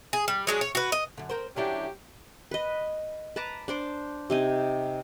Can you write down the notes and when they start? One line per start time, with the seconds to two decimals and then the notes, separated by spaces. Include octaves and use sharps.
0.13 G#4
0.28 G3
0.47 F#3 G#3 D4
0.61 C#5
0.75 F#4 B4
0.92 D#5
1.17 F#2 D3
1.29 C4 A#4 C5
1.56 D3 F#3 C#4 D4 E4 G4
2.51 B4 D#5
3.36 B4 A5 A#5 D6
3.68 D4 C5 D6
4.30 C3 D#4 G#5